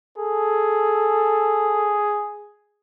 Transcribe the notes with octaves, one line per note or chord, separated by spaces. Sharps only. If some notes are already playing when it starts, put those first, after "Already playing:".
G#4 A4